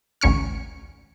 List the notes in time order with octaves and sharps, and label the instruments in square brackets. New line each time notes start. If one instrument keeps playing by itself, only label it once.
[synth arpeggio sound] A1 D2 C#4 C#6 F6